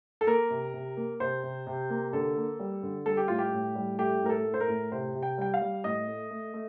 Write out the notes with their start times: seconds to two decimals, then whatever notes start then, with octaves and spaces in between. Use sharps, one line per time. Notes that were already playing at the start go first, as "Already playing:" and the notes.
0.21 A4
0.27 A#3 A#4
0.50 C3
0.74 C3
0.97 A#3
1.20 C3 C5
1.43 C3
1.67 C3
1.90 A#3
2.13 D3 A4
2.37 A#3
2.59 G3
2.83 D3
3.06 G3 A4
3.17 G4
3.28 A2 F4
3.38 G4
3.52 A2
3.75 G3
3.98 A3 G4
4.22 A2 A#4
4.29 A4
4.45 A3
4.54 C5
4.60 A#4
4.68 A2
4.92 C3 C5
5.15 C3
5.23 G5
5.38 G3 G5
5.54 F5
5.61 G3
5.84 A2 D#5
6.08 A3
6.31 A3
6.54 A3